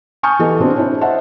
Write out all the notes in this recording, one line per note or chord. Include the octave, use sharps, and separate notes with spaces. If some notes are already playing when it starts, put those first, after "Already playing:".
G#5 A5 C#6 D#6 F6 G6
E3 B3 G4 A4 D#5
B2 C4 D4 G#4
D4 E4 C5 C#5
C5 D#5 E5 F#5 A5